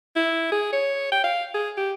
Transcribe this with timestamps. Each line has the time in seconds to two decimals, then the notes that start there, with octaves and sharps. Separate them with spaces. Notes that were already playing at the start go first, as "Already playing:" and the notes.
0.16 E4
0.52 G#4
0.72 C#5
1.12 G5
1.24 F5
1.54 G#4
1.77 G4